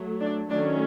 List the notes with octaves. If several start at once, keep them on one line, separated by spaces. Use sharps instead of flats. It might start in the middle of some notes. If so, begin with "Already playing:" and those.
Already playing: F#3 A3
D4
D#3 F#3 A3 C#4 D4